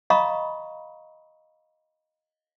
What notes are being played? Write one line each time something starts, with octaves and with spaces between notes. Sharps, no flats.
D#5 F5 A#5 B5 C#6 D#6